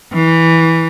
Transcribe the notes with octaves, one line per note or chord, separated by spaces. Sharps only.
E3